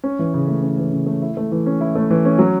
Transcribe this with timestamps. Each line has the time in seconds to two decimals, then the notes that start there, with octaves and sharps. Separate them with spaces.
0.04 C#4
0.19 E3
0.34 C#3
0.48 A3
0.63 C#4
0.78 E3
0.93 C#3
1.06 A3
1.22 E4
1.37 A3
1.52 E3
1.66 C#4
1.81 E4
1.95 A3
2.10 E3
2.25 C#4
2.39 F#3